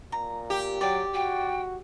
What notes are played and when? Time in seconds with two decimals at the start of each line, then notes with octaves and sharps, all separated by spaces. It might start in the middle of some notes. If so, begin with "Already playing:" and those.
0.12 A#2 A#5
0.50 G4
0.81 F#3 D5 G5
1.14 F#4 G5